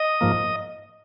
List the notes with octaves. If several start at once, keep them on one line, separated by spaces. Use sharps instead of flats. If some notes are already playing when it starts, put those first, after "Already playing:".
Already playing: D#5
G#2 F3 A#3